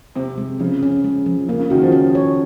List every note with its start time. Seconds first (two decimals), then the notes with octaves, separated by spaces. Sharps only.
0.16 C3 C4
0.38 G#3
0.60 C#3 F3
0.83 C#4
1.04 G#3
1.26 F3
1.48 C#3 A#3
1.60 C#3
1.70 D#3 F#4
1.82 F3
1.92 C#4
2.15 C#5